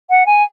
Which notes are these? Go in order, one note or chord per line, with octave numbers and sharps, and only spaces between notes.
F#5
G#5